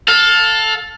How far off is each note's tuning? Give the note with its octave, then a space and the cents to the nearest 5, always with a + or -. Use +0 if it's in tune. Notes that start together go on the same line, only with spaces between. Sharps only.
A4 +0 F5 +25